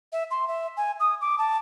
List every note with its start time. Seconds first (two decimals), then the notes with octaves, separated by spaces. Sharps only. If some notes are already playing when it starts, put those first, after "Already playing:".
0.12 E5
0.31 C6
0.48 E5
0.77 G#5
1.00 D#6
1.21 D6
1.38 A5